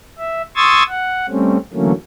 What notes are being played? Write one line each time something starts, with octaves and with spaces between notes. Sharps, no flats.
E5
C6 C#6 D#6 E6 G#6 A6
F#5
G3 A3 C4 C#4
D3 E3 F#3 A3 A#3 C#4